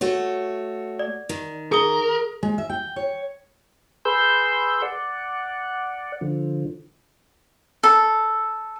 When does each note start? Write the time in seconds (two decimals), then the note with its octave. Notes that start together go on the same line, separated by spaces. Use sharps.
0.01 A3 F#4 C#5
0.99 D5
1.29 D#3
1.72 G#4 A#4 D#6 G7
2.43 G#3
2.58 E5
2.69 G5
2.96 C#5
4.05 G#4 B4 C6 E6 G6
4.82 D5 F#5
6.21 D3 F3
7.83 A4